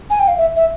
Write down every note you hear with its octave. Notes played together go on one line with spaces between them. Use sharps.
G#5
G5
F5
E5
E5